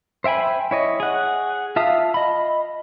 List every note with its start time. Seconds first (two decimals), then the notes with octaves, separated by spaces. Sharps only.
0.24 C5 E5 G5 G#5 B5
0.71 E4 C#5 D#5
1.00 G#4 F#5
1.76 F4 E5 F5 A5 D#6
2.14 D#5 B5